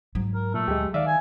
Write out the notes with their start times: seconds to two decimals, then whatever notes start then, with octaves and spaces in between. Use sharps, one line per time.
0.15 G#2 F#3
0.35 A#4
0.54 A#2 A3
0.68 D2 G#3 G4
0.94 D#3 D5 E5 F5
1.07 G#5